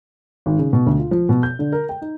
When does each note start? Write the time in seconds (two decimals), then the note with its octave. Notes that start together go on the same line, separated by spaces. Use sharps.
0.46 G#1
0.58 C#3
0.73 B2
0.87 D2
0.99 F4
1.11 F3
1.29 B2
1.43 G6
1.59 D3
1.72 A#4
1.89 G5
2.01 D#4